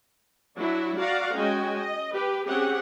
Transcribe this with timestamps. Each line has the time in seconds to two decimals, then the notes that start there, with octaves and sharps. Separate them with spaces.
0.58 F#3 D4 E4 F#4
1.00 F#4 D5 F5 F#5 A#5
1.35 G#3 C#4 F#4 D#5 G5 G#5
1.79 D#5
2.14 G4 B4
2.46 C4 C#4 G4 G#4 F#5